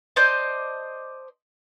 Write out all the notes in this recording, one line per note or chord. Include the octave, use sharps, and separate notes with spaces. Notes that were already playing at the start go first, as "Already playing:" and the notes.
C5 D5 D#5 A5